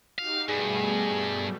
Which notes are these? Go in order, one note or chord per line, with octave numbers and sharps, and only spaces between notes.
D#4 F#4 G4 F5
G2 B2 G3 A3 G#4